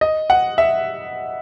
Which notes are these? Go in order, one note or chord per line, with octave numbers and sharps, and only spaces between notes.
D#5
F#5
E5